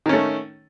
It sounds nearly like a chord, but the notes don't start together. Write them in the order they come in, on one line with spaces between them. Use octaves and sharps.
D#3 C#4 A3